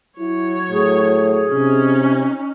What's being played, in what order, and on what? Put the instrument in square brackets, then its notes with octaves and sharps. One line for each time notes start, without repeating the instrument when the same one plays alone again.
[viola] F#3 C#5 [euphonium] E4
[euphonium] A2 [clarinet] G#4
[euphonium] C3 [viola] C#4 D#4